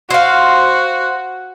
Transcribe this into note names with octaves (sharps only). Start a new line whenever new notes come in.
F#4 C5 F5